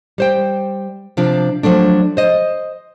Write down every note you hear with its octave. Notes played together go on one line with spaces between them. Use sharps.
G3 C5 G5
C3 F3 D4
F3 F#3 A3 D4
C5 D#5